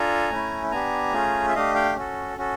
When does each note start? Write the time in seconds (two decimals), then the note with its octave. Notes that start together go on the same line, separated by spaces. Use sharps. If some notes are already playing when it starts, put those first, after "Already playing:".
Already playing: D4 F4 A4 G#5 A#5
0.30 A3 C#4 E4
0.71 B3 D4 G4 G#5 A#5
1.13 A3 C#4 F4 G#4
1.49 E5
1.55 A3 D4 G4 D#5 F5
1.75 F5 G5
1.96 C#4 F#4 A4
2.37 C#4 F#4 A4